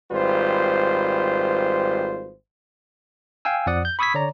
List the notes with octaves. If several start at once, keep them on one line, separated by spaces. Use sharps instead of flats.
G#1 G3 F4 B4 C5
F5 G5 G#5 E6
F2 F3 D5 F#5 D#6
G6
B5 C#6 D#6 E6 G#6 B6
D3 C#5 D5 A#5